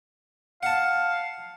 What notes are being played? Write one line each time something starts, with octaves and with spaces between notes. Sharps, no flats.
F5 F#5 A5